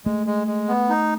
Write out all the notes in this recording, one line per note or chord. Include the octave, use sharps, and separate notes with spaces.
G#3 A3
G#3
G#3
B3
D#4